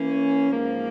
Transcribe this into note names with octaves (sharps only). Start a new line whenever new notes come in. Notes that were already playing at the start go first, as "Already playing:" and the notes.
Already playing: E3 A#3 C#4
G#2 F3 A#3